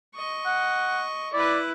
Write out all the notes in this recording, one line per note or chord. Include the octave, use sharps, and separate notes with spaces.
D#5 C#6
F#5
E4 B4 D5